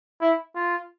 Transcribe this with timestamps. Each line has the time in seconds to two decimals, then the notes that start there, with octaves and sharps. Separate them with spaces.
0.21 E4
0.55 F4